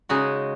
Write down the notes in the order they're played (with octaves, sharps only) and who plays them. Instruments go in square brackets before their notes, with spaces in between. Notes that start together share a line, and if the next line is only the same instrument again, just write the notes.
[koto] C#3 G#3 D#4 F#4